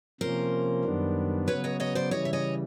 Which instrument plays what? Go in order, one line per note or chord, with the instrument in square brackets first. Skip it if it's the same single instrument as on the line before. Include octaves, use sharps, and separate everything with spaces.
[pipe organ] C3 F3 A#3 C#4 [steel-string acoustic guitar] A#4 C5
[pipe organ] F#2 D#3 G3 B3 D4
[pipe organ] C#3 F#3 B3 [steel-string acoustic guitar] B4 C#5
[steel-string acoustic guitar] C#5 D#5
C#5 D#5
C5 D5
[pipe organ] C#3 E3 G3 [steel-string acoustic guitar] C#5 D#5
[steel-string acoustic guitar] E5
C#5 D#5